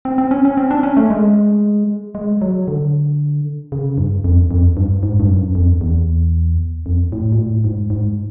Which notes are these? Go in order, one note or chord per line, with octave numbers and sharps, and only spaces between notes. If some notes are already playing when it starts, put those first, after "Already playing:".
C4
C4
C#4
C#4
C4
D4
C#4
A3
G#3
G#3
F#3
D3
C#3
G2
F2
F2
G2
G#2
G2
F#2
F2
E2
F2
A2
A#2
A2
G#2
G#2